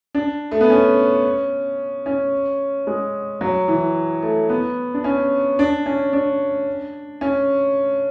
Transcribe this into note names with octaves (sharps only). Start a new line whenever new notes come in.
D4
A3
B3
C#4
C#4
G#3
F#3
E3
A3
B3
D4
C#4
D4
C#4
D4
C#4